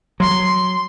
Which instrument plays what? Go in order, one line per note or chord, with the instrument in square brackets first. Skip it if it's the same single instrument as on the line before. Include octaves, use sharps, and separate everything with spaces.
[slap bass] F#3 [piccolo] C6